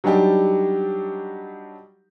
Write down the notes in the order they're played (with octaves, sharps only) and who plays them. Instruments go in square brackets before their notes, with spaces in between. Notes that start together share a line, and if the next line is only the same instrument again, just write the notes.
[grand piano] F#3 G3 D4 D#4 G4